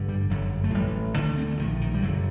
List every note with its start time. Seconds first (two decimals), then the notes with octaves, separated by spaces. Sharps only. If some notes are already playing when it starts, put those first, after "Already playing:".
Already playing: A1 G2 D3
0.09 G3
0.30 G1 F#2 D3 F#3
0.64 A3
0.74 A1 A2 G3
1.16 D2 D3 G3
1.27 A3
1.37 C4
1.48 A3
1.59 A#1 A2 D#3
1.81 D#3
1.94 G3
2.02 F#1 F#2 D3 F#3